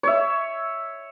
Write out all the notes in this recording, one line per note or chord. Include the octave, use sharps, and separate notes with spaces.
C#5 E5